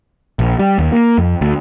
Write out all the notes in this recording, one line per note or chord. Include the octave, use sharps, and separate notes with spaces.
A#1
G3
D#2
A#3
F2
D2